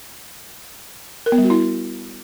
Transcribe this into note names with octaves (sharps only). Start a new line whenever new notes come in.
A#4
B3
G3
F#4
E4